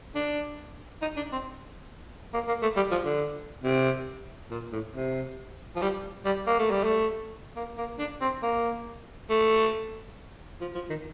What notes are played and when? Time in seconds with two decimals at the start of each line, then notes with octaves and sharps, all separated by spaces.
0.15 D4
1.02 D#4
1.17 D4
1.32 C4
2.34 A#3
2.48 A#3
2.62 A3
2.76 G3
2.91 F3
3.05 D3
3.64 C3
4.51 A#2
4.72 A2
4.95 C3
5.76 F3
5.82 G3
6.25 G3
6.47 A#3
6.59 A3
6.71 G3
6.84 A3
7.56 A#3
7.78 A#3
7.99 D4
8.21 C4
8.43 A#3
9.30 A3
10.61 F3
10.75 F3
10.90 D#3